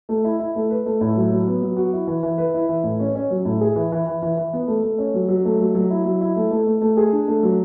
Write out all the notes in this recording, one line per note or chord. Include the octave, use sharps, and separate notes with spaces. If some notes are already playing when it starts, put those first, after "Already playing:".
A3
E4
E4
A3
B4
A3
A2
F#3
F#3
B3
F#3
F#4
E4
E3
E3
B4
E4
E3
A2
C#4
C#4
F#3
A2
G#4
E3
E3
E3
E3
E3
B3
A3
A3
C#4
F#3
F#3
A3
F#3
F#3
E4
F#3
E4
A3
A3
A3
A3
G#4
D4
A3
F#3